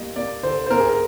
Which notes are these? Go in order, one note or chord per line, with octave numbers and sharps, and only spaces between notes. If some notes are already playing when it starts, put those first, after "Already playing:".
Already playing: G3 A#3 D#5
A#3 D5
D3 C5
C5
A#3 A#4
G#4
A#4